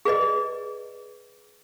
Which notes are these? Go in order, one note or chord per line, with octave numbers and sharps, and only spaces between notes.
G#4 B4 D5 D#5